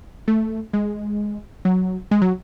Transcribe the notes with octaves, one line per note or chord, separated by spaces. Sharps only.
A3
G#3
F#3
G#3
F#3